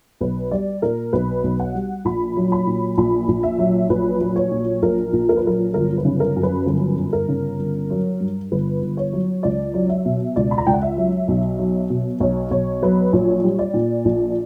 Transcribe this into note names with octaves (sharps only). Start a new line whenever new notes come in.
B1 B4
G3 D5
A#2 A#4
B1 B4
B1
F#5
G3
A#1 B5
F#3
B5
A#2
A#1 B5
A#1
E5
F#3
A#1 B4
F#3
C#5
A#2
A#1 A#4
A#1
A#4
B4
F#3 A#4
G1 A#4
B4
C#3
A#4
F#2
B4
G1 B4
G1
A#4
C#3
G1
F#3
G2
G1 B4
G1
C#5
F#3
C#2 D5
F#3
E5
B2
C#2 D5
B5
A#5
C#2 G5
F#5
E5
F#3
B1
F#3
B2
B1 C#5
B1 C#5
F#3 B4
A#1 C#5
G3
D5
A#2
A#1